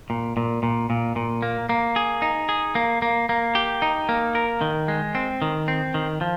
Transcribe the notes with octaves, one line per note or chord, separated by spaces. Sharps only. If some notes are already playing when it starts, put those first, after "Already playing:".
A#2
A#2
A#2
A#2
A#2
A#3
A#3
G#4
D#4
G#4
A#3
A#3
A#3
G4
D#4
A#3
A#4
D#3
G#3
C4
D#3
C4
D#3
F3